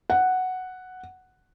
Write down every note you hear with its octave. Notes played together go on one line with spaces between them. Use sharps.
F#5